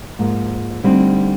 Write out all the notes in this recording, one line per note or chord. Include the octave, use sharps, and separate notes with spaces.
G#2 F3 A#3
D2 D3 G3 C4 D#4